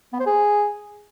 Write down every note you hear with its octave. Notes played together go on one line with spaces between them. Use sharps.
B3
C5
G#4